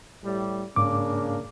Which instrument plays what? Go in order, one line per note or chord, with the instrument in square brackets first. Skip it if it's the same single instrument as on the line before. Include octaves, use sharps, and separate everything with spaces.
[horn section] A2 G3
[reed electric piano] G#2 D6 [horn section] C#3 A#3 D4